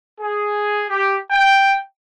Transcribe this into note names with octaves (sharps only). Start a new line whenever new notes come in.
G#4
G4
G5